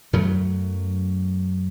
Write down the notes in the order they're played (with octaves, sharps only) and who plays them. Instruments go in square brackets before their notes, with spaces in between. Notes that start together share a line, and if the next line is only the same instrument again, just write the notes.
[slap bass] F#2 F#3 A3